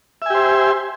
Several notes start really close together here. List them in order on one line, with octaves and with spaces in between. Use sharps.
E5 G#5 G4 C5